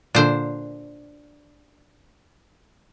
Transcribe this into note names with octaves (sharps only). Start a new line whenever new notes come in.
A#2 D3 D4 C5